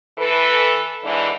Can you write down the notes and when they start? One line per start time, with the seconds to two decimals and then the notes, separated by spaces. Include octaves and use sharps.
0.18 E3 A4 B4
1.04 G#2 D3 E3